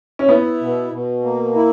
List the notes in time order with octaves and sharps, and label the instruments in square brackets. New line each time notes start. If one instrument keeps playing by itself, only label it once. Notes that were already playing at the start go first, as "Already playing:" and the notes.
[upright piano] C#4
[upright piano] B3 [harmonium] E4
[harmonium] B2
B2
A#3
E4